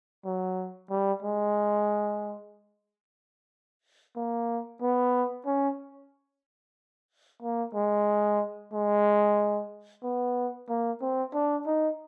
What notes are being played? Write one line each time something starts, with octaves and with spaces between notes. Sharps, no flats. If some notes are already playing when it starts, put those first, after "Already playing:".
F#3
G3
G#3
A#3
B3
C#4
A#3
G#3
G#3
B3
A#3
C4
D4
D#4